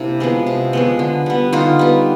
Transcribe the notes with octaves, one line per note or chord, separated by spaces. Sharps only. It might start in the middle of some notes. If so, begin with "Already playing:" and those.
Already playing: C3 A#3 D4 E4
F3 G#3 B3
C3
F3 G#3 B3
D3
G3 B3
D3 D#4 F4
G3 B3